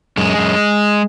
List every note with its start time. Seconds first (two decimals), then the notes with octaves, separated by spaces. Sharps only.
0.17 F#2 G#3
0.38 F#2